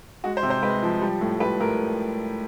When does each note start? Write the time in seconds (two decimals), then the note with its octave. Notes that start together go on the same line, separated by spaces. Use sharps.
0.24 G#3 F#4
0.37 C5
0.43 C3
0.50 C5
0.62 G#3 B4
0.82 F3
1.01 G3
1.21 A2
1.40 G3 B4
1.60 A2 A#4